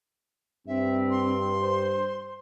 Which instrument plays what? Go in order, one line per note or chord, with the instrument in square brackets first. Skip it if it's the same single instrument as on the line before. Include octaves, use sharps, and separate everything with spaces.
[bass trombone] G2 [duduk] C4 [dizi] E5
[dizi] C6
[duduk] C5